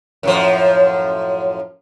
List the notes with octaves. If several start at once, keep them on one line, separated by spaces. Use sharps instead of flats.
F#2 A2 F3